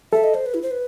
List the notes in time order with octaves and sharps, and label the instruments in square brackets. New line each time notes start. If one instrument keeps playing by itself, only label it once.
[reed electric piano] A4 [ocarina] E5
[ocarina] D#5
C5
B4
E4
C5
B4